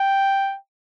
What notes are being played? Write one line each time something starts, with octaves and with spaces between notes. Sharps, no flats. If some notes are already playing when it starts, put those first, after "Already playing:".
Already playing: G5